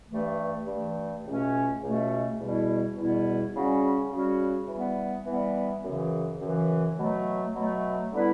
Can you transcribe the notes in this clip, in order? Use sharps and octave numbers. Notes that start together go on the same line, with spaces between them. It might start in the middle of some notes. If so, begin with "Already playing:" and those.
G2 E3 A3
G2 E3 A3
C#2 B2 A3 C#4
C#2 B2 A3 C#4
E2 B2 G3 B3 E4
E2 B2 G3 B3 E4
C#3 G3 C#4 F#4
C#3 G3 C#4 F#4
E3 G3 B3
E3 G3 B3
F#2 C#3 E3
F#2 C#3 E3
B2 F#3 A3
B2 F#3 A3
D3 G3 B3 E4 B4